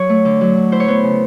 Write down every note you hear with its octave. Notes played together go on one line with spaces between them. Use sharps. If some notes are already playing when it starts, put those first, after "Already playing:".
Already playing: F#3 C#5
A3
D3
F#3
D3
E4 C5
C#5
B3 C5
C#3